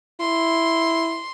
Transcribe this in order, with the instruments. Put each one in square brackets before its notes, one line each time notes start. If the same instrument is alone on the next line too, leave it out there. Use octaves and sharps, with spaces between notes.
[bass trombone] E4 [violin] C6